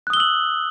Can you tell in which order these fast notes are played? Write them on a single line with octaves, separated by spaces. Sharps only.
F#6 D#6 G7 E6 F#7